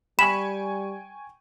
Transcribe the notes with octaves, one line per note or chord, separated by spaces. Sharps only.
G3 G5 G#5 B5 C#6 E7